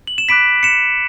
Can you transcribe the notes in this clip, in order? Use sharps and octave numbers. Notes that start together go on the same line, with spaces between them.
F#7
E7
B5 D6 F#6 B6 D7
C#7 E7